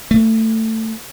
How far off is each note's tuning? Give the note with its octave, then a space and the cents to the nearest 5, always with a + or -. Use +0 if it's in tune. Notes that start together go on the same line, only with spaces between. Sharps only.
A3 +20